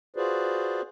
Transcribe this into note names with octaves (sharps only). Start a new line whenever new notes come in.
F4 F#4 G#4 B4 C5 D5